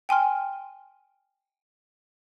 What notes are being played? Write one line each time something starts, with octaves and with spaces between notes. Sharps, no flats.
G5 G#5 C6 F6